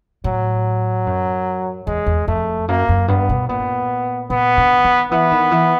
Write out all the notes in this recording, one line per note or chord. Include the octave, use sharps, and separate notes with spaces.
A2 F#3
F#2
E2 G#3
E2
F2 A3
F#2 A#3
F#2
G2 B3
B2
A#2 B3
A#2 B3
D3
D#3
E3 B3
D#3
E3